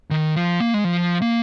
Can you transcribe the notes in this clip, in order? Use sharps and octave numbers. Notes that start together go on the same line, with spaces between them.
D#3
F3
A#3
G#3
F3
A#3